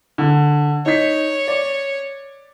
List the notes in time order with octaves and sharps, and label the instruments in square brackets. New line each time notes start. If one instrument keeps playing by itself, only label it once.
[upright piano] D3
[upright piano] D#4 B6 [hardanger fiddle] C#5
[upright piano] D5